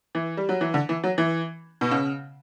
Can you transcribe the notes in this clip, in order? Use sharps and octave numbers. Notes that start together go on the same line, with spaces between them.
E3
G3
F#3
E3
D3
E3
F#3
E3
B2
C#3